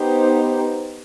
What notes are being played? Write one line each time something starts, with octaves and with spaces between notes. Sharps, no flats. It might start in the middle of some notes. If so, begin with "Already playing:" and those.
Already playing: B3 D#4 G4 C5